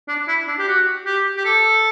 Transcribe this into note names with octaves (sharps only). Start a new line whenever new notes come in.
D4
E4
D4
G4
F#4
G4
G4
A4